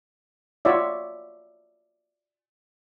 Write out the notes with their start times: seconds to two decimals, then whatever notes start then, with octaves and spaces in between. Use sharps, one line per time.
0.65 F4 F#4 C#5 D5 E5